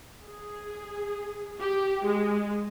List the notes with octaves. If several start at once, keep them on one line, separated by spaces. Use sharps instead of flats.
G#4
G4
G#3